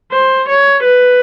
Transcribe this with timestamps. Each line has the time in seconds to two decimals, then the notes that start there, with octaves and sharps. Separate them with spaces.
0.11 C5
0.48 C#5
0.84 B4